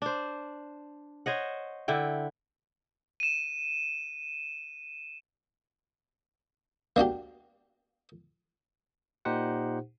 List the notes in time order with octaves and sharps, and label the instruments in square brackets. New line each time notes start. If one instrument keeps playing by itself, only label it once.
[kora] D4 C5
C5 C#5 D#5 F#5
D3 E4 G5
[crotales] D#7 E7
[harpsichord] A#3 D4 F#4 G4
[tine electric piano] A#2 D#4 G4 C5 F#5